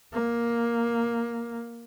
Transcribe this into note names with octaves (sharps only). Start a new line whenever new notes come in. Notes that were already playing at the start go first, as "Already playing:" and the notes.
A#3